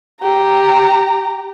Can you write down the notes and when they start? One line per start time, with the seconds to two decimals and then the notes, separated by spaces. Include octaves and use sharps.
0.21 G4 A#5